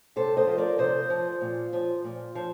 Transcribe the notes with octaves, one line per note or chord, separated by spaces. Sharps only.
C3 A4 C5
C5 D#5
F3
A#4 D5
C3 C5 D#5
F3
A#2
F3
A#2
F3